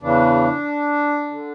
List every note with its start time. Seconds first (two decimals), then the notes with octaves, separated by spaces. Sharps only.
0.01 E2 C#3 E3 D4
1.31 D3